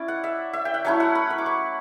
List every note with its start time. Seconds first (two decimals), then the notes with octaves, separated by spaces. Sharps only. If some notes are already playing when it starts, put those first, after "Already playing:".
Already playing: C#4 E4 D5
0.08 F#5
0.24 E5
0.53 E5
0.65 G5
0.74 F#5
0.85 F#3 A3 C#4 E4 E5
1.00 F#5
1.15 B5
1.30 B5
1.38 D6
1.46 C#6